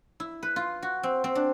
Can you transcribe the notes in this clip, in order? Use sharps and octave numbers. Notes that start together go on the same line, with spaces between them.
E4
B4
F4
F#4
C4
C4
D4